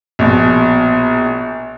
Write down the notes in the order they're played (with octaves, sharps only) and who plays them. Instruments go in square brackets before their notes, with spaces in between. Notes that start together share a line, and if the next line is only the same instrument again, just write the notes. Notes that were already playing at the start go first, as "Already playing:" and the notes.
[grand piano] A#1 B2